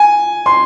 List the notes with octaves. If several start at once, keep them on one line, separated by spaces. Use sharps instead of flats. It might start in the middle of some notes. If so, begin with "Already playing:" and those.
Already playing: G#5
C6